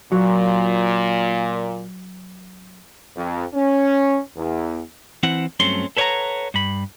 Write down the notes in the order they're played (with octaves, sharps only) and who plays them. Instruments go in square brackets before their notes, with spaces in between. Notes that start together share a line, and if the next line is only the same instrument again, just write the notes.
[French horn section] A#2 [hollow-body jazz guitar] F#3
[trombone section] F2
C#4
E2
[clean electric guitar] E3 C4 E4 F#5
G2 F#3 A3 C4 C#4 C6
A4 B4 C#5 D5 F#5 A#5
G2 B5